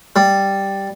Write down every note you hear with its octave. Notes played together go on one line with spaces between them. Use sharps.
G3